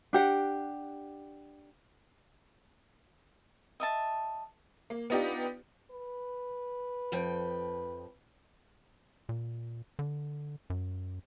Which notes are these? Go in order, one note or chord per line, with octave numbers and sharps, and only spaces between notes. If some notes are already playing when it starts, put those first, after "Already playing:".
D4 G4 F#5
D#5 E5 A5
A#3
B3 D4 D#4 F4 G4
B4
F2 F3 G5
A#2
D3
F#2